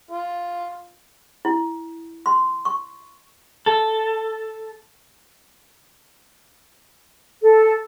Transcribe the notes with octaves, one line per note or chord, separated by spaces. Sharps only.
F4
E4
C6
C#6
A4
A4